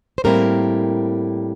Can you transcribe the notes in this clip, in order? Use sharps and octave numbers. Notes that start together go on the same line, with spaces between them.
C5
A2 G3 A#3 C4 E4 A#4